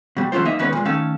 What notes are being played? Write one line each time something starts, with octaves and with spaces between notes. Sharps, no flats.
B2 G3
E3 F#3 A3 C#4 F4 C5
A#3 D#4 D#5 E5
E2 G#2 D#3 C#4 B4 C#5
A#2 G#3
D#3 A3 C#4 A4 F5